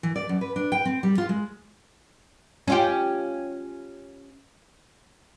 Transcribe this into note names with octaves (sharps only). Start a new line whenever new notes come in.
E3
D5
F#2
B4
D4
G5
C4
G3
F4
G#3
C#4 F4 G4